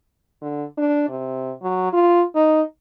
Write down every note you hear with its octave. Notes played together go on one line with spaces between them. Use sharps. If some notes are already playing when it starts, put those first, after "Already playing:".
D3
D4
C3
F#3
F4
D#4